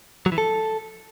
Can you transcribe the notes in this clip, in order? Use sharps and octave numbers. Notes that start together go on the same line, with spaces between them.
F#3
E3
A4